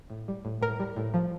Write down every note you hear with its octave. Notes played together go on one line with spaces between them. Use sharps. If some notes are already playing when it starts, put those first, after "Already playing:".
A2
G3
A2
A2 A#4
G3
A2
F3